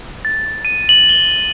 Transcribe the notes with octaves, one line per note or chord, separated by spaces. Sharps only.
A6
D#7
F#7
G7